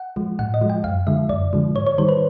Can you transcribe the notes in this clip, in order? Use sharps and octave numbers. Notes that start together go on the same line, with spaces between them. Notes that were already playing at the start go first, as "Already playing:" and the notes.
Already playing: F#5
F3 G#3
A2 F#5
D#5
F3 G#3
G5
F#2 F5
D3 F3 G#3 E5
F#2 D5
D3 F3 G#3
G#2 C#5
C#5
D#3 G3 C5
B4